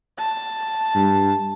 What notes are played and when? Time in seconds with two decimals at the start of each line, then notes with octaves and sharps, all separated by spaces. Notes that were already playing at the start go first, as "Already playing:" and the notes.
0.18 A5
0.95 G2